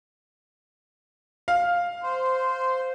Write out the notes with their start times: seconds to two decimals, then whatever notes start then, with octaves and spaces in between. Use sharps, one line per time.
1.48 F5
2.03 C5